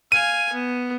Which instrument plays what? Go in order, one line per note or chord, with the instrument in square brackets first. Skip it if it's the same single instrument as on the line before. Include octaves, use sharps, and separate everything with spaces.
[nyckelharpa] F5 G#5 [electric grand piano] D#7
[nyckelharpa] B3